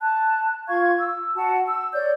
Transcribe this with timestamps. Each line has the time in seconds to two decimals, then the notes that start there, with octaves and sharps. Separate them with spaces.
0.01 A5 F#6
0.68 F4 F5 C#6 G#6
0.98 E6
1.36 F#4 F#5 A5
1.67 E6
1.93 C#5 D5 G6